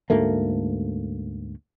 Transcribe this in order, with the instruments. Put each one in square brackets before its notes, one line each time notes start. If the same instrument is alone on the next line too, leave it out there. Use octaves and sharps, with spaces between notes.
[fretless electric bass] D2 G#2 A3 A#3